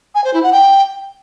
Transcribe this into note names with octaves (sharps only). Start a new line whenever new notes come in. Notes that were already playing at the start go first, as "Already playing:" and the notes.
G#5
C5
E4
F#5
G5